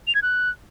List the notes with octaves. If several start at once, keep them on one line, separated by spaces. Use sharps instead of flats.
F7
G#6
F#6